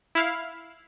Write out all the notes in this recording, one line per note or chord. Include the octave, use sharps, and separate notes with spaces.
E4 F5